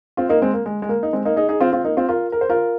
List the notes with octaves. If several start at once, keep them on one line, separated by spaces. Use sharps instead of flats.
C4 F4
A#3 D#4
G#3 C4
A#3
G#3
G#3
A#3
D#4
G#3 C4
A#3 D#4
D#4 G#4
D#4 G#4
C4 F4
C4 F4
A#3 D#4
C4 F4
F4 A#4
A#4
C5
F4 A#4